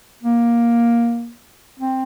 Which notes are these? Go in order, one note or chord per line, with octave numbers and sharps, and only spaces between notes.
A#3
C4